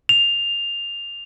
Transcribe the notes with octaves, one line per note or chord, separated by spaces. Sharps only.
F7